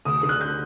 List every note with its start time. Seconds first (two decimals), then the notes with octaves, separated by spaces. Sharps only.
0.05 D2 D#6
0.23 D3
0.29 F#6
0.41 G6